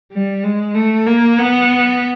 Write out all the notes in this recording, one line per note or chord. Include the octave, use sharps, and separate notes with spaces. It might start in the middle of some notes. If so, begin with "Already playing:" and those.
G3
G#3
A3
A#3
B3